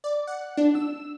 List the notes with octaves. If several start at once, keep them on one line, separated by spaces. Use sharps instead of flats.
D5
F#5
D4
E6